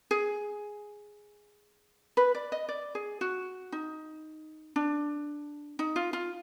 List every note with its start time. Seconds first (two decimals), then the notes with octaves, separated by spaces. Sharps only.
0.11 G#4
2.17 B4
2.35 D5
2.52 D#5
2.69 D5
2.95 G#4
3.21 F#4
3.72 D#4
4.76 D4
5.79 D#4
5.96 F4
6.13 F4